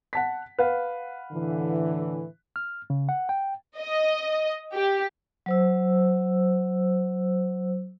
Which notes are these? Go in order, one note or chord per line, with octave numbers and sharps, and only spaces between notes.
F#5 A5 B6
B4 F5 F#5
A2 D3 E3
F6
C#3
F#5
G5
D#5
G4
F#3 C5 E6